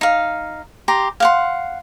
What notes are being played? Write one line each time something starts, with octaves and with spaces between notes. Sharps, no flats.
D#4 F5
G4 A#5 C6
F5 F#5 C6